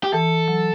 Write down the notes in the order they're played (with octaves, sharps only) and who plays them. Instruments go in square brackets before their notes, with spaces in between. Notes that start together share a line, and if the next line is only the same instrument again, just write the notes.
[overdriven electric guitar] G4
[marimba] E3 [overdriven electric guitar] A4
[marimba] F#3